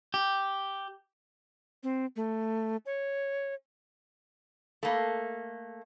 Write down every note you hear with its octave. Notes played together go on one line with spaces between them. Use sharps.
G4
C4
A3
C#5
A3 A#3